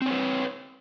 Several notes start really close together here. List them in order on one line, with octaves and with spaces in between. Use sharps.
C4 C#5 B4